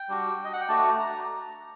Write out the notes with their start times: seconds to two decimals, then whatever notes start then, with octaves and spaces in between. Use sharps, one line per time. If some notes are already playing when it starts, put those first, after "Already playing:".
Already playing: G5
0.08 G3 D4 F#4
0.45 D#5
0.53 F#5
0.61 G5
0.69 A3 D4 F#4 A5
0.99 A#5